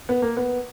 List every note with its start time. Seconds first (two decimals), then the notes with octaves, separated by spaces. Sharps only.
0.09 B3
0.22 A#3
0.37 B3